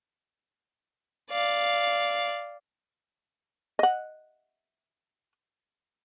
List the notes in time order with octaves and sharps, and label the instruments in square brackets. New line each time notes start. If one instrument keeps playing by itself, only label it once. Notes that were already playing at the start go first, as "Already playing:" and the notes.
[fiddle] D5 F5
[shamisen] D#5 F#5